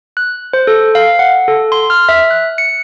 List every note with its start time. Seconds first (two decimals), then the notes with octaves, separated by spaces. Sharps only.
0.17 F#6
0.53 C5
0.67 A4
0.95 F5
1.19 F#5
1.48 A4
1.72 C6
1.90 F6
2.09 E5
2.31 F#6
2.58 C#7